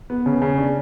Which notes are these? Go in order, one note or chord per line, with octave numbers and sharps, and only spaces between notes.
B3
C#3
C#3
D4